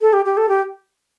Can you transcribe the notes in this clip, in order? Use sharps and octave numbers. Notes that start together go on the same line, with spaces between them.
A4
G4
G4
A4
G4